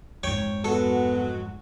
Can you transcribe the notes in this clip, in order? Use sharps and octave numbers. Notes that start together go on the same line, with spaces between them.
F2 G#2 C#5 G5
F#3 G#3 B3 F#4 A4